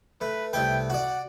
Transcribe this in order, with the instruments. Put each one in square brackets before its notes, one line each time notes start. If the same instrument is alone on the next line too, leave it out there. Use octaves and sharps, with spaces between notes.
[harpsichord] A3 [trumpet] B4
[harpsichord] C2 A3 B4 [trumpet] G5
[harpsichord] F#4 D5 [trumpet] F#5